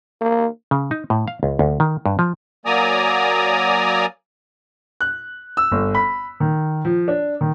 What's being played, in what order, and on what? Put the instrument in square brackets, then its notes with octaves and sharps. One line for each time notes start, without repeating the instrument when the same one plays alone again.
[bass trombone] A#3
[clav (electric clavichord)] C#3
D#4
A2
F5
C#2
D2
D#3
G2
F3
[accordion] F#3 A#3 D5 G#5 A#5 D#6
[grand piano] F#6
E6
G1
B5
D#3
F3
D4
D#3